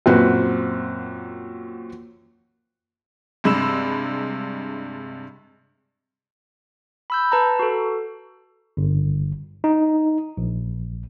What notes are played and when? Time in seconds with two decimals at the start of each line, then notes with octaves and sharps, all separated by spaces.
0.06 F#2 A#2 C4 F#4 B4
3.44 G2 C3 G#3 B5 E6 E7
7.10 B5 E6 G6
7.32 B4 A5 A#5
7.59 F#4 A4
8.77 G1
9.64 D#4
10.37 A#1